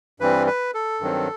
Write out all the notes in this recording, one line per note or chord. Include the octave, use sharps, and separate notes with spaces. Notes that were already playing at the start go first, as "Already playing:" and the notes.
G2 E3 G3 C4 B4
B4
A4
G2 D#3 F#3 C4